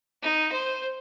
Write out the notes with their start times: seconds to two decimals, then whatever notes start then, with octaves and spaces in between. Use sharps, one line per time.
0.22 D#4
0.52 C5